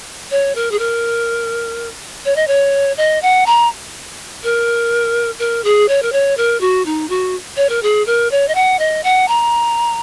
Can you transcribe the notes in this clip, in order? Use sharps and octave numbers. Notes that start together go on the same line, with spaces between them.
C#5
A#4
G#4
A#4
C#5
D#5
C#5
D#5
F#5
A#5
A#4
A#4
G#4
C#5
A#4
C#5
A#4
F#4
D#4
F#4
C#5
A#4
G#4
A#4
C#5
D#5
F#5
D#5
F#5
A#5